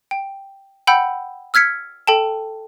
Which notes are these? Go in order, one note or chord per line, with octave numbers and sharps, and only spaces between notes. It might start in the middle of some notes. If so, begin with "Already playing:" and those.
G5
F#5 G5 B5 E6 G6
E6 F6 G#6 B6 C#7
A4 G5 A5